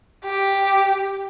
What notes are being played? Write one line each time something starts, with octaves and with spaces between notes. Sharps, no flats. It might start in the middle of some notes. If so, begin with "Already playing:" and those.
G4